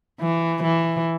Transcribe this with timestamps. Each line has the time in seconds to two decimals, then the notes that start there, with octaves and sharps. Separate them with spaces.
0.21 E3
0.64 E3